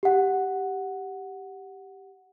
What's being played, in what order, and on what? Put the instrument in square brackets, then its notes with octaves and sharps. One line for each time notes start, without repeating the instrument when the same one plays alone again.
[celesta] G4 F#5